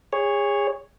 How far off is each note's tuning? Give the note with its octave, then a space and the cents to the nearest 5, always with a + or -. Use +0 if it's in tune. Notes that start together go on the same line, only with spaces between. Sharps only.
G#4 -30 C#5 +0